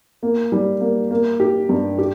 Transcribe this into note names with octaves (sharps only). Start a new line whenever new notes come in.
A#3
G3
A#3
A#3
G4
G2
G4